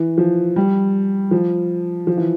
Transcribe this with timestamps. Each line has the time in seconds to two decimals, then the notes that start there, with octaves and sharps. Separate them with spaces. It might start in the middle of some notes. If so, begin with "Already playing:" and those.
Already playing: E3
0.18 F3
0.56 G3
1.31 F3
2.07 F3
2.17 E3